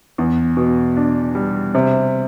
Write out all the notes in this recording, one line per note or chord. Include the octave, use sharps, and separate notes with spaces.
E2
B2
D4
G3
C3